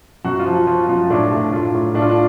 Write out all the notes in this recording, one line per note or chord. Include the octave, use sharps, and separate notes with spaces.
F#2 F#4
F4
F3
F3 F4
F#2 F4
A2 D4
A2
A2 F4
A2
A2 D4
F4
D4